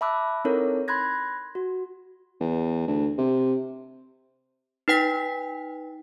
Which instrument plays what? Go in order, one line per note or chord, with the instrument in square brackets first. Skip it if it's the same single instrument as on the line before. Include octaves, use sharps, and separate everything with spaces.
[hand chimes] E5 A5 B5 D6 E6 F#6
C4 D#4 E4 A4 A#4 C#5
B5 C6 F#6 G#6 A#6
F#4
[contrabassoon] E2
D2
C3
[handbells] D#4 B4 G5 B6